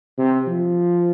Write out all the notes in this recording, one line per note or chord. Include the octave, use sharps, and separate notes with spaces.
C3
F3